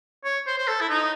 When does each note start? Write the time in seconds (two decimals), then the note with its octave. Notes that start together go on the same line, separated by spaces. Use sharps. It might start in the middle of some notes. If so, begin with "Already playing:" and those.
0.24 C#5
0.47 C5
0.58 C5
0.68 A4
0.81 E4
0.89 D#4